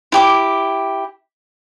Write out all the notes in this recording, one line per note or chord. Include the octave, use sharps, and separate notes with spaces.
E4 G4 D6